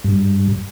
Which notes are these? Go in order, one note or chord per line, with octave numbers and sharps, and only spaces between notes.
G2